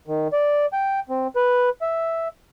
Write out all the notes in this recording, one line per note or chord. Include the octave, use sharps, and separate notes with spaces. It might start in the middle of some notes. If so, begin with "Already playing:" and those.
D#3
D5
G5
C4
B4
E5